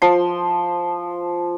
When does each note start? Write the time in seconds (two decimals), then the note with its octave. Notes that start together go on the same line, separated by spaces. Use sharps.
0.02 F3 C6